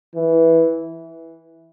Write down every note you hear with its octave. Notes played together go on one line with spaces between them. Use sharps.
E3